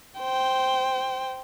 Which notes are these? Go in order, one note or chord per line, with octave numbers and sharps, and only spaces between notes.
C5 G5